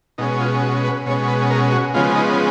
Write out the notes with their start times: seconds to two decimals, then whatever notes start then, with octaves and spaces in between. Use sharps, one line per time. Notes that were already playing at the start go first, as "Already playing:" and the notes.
0.18 B2 G#3 C#4 D#4
0.40 F4
0.62 F#4
0.85 B4
1.06 B2 G#3 C#4 C#5
1.28 B4
1.51 A#4
1.72 F#4
1.94 C#3 F3 G#3 B3 F4
2.15 D#4